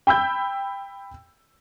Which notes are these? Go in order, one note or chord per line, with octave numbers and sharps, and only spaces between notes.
G5 B5 E6 G6